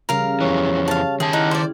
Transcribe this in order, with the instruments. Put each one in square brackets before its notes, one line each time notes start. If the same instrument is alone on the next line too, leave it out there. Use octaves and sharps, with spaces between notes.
[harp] C#3 G3 [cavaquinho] A#4 F5
[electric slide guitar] F2 E3 [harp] C#5
[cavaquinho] F5 A5
[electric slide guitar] D#3 A5 [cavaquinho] G#4 [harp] E5 G5 G#6
[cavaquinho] D#4 F#5 [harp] E4 F6
[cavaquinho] C5 D5